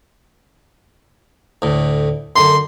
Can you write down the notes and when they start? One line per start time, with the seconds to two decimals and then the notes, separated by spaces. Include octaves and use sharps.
1.62 D2 A2
2.36 F#2 D3 C6